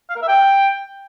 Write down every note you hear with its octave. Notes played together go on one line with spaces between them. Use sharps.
F5
A#4
E5
G5